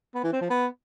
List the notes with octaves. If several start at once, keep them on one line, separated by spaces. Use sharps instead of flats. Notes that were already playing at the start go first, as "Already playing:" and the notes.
B3
E3
C4
F3
B3